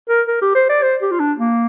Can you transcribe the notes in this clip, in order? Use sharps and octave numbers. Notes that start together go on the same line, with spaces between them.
A#4
A#4
G4
C5
D5
C5
G4
F4
D4
A#3